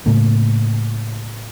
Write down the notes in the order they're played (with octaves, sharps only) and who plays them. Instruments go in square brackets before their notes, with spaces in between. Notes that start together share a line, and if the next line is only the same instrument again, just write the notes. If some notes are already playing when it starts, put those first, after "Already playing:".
[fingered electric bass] A2 C#3 A3 A#3